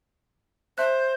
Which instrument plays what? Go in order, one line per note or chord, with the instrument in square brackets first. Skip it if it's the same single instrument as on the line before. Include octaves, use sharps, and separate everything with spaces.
[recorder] C5 [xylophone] E5 F#6